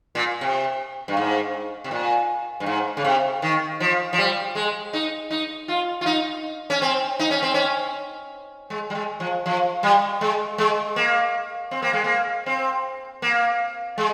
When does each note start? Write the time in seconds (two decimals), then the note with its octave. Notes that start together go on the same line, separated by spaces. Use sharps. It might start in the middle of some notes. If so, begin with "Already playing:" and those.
0.15 A#2
0.41 C3
1.08 G2
1.17 G#2
1.84 C3
1.91 A#2
2.60 G2
2.66 G#2
2.97 C#3
3.04 C3
3.42 D#3
3.80 F3
4.13 F3
4.18 G3
4.55 G#3
4.93 D#4
5.31 D#4
5.68 F4
6.01 F4
6.06 D#4
6.70 C#4
6.82 C4
7.19 D#4
7.31 C#4
7.43 C4
7.54 C#4
8.70 G#3
8.90 G3
8.95 G#3
9.20 F3
9.46 F3
9.83 G3
10.21 G#3
10.58 G#3
10.96 A#3
11.71 C4
11.82 A#3
11.93 G#3
12.04 A#3
12.46 C4
13.22 A#3
13.98 G#3